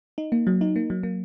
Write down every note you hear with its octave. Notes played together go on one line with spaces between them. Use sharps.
D#4
A#3
F#3
D#4
A#3
F#3
A#3